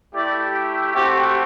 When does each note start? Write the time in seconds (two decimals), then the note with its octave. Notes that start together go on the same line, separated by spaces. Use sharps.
0.14 A3 E4 G4 D5
0.95 A3 C4 F#4 G4